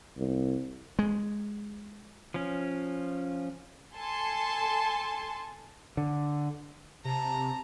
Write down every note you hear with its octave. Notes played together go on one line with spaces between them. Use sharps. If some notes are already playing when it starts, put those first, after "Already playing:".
C2
G#3
F3 C#4
A4 G#5 A5 C6
D3
C3 A5 A#5